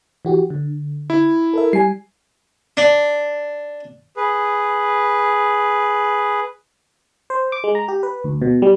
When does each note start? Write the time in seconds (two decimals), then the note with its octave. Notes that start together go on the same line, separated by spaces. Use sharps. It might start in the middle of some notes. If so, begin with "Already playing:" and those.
0.25 E3 F#4 G4
0.50 D3
1.10 E4
1.53 A4 A#4 E5
1.73 G3 G#5 C7
2.77 D4
4.16 G#4 B4
7.30 C5
7.52 D6
7.64 G#3
7.75 A#5
7.88 G4
8.03 B4
8.24 D2
8.42 B2
8.62 G3